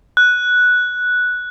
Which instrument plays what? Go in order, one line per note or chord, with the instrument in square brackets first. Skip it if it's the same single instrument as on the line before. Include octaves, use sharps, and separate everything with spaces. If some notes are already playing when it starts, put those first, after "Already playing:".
[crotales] F#6